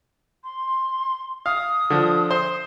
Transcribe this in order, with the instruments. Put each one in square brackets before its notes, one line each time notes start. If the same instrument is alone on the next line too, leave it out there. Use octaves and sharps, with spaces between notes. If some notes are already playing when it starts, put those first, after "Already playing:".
[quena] C6
[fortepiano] F5 [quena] D#6
[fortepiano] D3 F3
C5